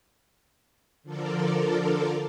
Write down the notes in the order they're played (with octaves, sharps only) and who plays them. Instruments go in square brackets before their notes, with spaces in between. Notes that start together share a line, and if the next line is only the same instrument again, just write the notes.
[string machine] D3 F3 F4 A4 A#4 D5